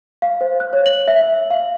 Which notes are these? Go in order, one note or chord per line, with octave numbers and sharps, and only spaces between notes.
F5
C5
F#6
C#5
F#7
E5
E5
F5